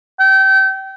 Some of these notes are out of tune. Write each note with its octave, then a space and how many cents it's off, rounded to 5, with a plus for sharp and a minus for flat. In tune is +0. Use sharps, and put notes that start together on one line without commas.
G5 -30